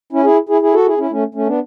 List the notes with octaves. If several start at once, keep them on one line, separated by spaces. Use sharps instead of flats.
C#4 E4
E4 G#4
E4 G#4
E4 G#4
F#4 A4
E4 G#4
C#4 E4
A3 C#4
A3 C#4
B3 D4